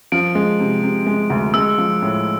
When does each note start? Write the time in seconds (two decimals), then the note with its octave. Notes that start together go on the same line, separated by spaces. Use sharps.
0.12 F3 D7
0.35 G#3
0.60 C3
0.83 C3
1.07 G#3
1.30 D2
1.54 G#3 E6
1.78 F3
2.02 A2